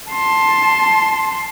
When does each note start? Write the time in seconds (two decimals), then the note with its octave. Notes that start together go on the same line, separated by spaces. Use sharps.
0.12 A5 C6